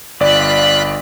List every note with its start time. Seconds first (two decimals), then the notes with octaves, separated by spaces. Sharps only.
0.20 G1 F4 D5 B5 F#6